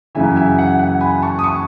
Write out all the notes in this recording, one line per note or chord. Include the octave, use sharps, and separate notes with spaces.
F#2 C#3 E3 E5 G#5
E5 G#5
E5
F#5
F#5
G#5 B5
A5 C#6
D#6
A5 C#6